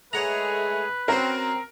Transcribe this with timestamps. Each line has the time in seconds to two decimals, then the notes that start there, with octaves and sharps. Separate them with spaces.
0.13 G#3 A3 G#4 B4 C#5 F#5 A#5
1.08 C4 C#4 F#4 A#4 C5